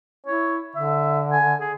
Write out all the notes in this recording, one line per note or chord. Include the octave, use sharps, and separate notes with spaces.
E4 C#5
D3 E5
G#5
G#4